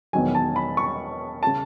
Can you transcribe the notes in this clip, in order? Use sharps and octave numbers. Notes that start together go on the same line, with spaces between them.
E1 E2 D#3 F#3 G#5
A5
B5
C#6
C#3 A5